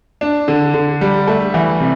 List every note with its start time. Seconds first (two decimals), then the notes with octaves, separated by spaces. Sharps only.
0.21 D4
0.48 D3
0.74 D3
1.01 G3
1.27 A3
1.54 E3
1.80 C3